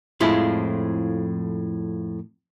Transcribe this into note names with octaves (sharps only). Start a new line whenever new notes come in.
F2 A2 F3 G#3 E4 F4